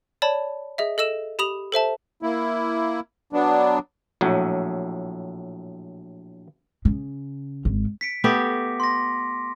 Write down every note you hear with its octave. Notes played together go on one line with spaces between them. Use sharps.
C#5 D5 A5 B5
G#4 D#5 E5
A4 D#5 E6 E7
G4 B5 D#6 F7
A4 C5 E5 A5
A#3 E4
F#3 B3 D4
A#1 A2 F#3
C#3
G#1
B6 C#7 D7
A3 B3 G4 D6 A#6
C6 A#6